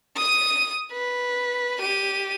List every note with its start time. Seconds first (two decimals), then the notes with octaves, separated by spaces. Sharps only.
0.16 D#6 D#7
0.92 B4
1.79 G4 D#7